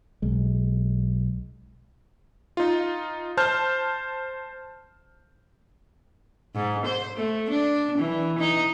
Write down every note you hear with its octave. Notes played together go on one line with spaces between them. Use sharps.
B1 G#3
D#4 F4
C5 A5 F6 G6
G#2
C5
A3
D4
E3
D#4